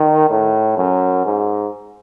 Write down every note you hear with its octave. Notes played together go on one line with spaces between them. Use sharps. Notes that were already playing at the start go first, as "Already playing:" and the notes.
Already playing: D#3
A2
F#2
G#2